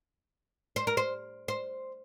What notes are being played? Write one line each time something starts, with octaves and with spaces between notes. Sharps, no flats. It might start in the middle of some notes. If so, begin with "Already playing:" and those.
C5
A#4
C5
C5